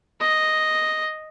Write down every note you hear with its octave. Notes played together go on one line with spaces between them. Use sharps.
D#5